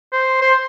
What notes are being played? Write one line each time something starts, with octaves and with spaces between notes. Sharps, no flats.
C5
C5